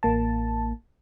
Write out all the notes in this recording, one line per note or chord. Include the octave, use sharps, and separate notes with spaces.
A1 A#3 A5